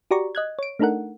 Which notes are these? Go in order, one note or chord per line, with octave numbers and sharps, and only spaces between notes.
F#4 G4 D5 A#5 C#6
D#5 F#6 G#6
C#5 D7
A3 D4 D#4 A4 A#4 F#5